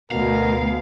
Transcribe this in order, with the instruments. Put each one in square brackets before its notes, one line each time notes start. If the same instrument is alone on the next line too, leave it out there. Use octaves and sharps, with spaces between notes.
[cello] D2 [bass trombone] B2 [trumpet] A#4 [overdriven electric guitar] F5